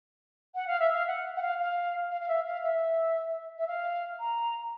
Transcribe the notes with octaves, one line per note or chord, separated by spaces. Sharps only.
F#5
F5
E5
F5
F#5
F#5
F5
F5
F5
F5
E5
F5
E5
E5
F5
A#5